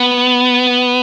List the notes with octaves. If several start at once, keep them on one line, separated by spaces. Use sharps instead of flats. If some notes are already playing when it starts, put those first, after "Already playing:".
Already playing: B3